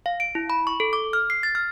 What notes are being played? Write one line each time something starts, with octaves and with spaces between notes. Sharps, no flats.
F5
D7
E4
B5
C#6
A4
D6
F6
C7
A6
F6